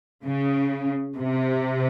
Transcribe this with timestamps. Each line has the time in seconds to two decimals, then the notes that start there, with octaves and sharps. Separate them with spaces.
0.25 C#3
1.16 C3